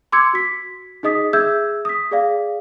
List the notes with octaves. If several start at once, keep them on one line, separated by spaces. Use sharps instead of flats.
C6 D6 E6 G#6 C#7
F#4 B6
D#4 G#4 D#5 D#6 B6
G#4 E5 E6 G6 G#6
D#6 B6
G#4 D5 F5